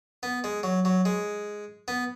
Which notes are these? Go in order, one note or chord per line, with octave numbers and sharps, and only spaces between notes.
B3
G#3
F#3
F#3
G#3
B3